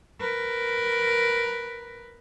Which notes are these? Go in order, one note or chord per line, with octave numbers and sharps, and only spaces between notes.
A#4 B4